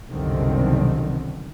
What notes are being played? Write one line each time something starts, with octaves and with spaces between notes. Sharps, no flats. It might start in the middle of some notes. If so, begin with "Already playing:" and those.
C2 F#2 B2 D3 D#3 C4